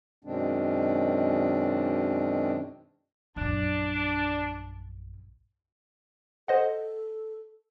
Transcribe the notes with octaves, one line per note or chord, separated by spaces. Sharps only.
F#2 B2 D#3 G#3 C4 D4
A#1 F#2 D4
A4 C5 D#5 F#5